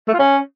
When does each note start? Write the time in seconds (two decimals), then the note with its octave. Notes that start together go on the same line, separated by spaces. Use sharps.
0.08 A3
0.13 F4
0.19 C#4